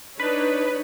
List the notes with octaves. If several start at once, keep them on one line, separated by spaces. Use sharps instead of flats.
D4 D#4 B4 C#5